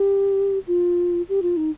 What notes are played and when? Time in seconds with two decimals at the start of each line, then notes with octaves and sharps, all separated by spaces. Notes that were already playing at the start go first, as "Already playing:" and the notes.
Already playing: G4
0.67 F4
1.29 G4
1.42 F4
1.57 D#4